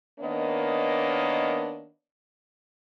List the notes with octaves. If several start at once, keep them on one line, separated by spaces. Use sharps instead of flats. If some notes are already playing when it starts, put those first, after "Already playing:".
D#3 A#3 B3 D4 C#5 D#5